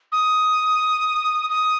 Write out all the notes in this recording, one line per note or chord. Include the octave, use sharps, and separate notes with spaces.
D#6
D#6